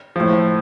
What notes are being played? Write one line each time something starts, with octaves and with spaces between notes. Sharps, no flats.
A2 F3